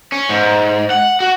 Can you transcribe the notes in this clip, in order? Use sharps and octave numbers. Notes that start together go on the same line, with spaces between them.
C#4
G#2
F#5
F#4